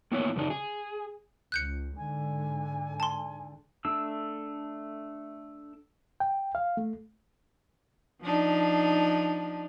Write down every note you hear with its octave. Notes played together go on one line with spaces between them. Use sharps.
A2 A#3 B3 E4 C#5
F#2 C#3 D4 D#4
G#4
C#2 F#6 G6 C#7
G#2 D3 G#5
A5 C6
A3 D4 E6
G5
F5
A3
F3 D4 D#4